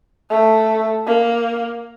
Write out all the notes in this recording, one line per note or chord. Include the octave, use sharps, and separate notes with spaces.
A3
A#3